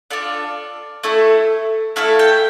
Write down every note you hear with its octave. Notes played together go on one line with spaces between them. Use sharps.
D4 F4 A4 D5
A3 E4 A4
A3 E4 A4 F5
G5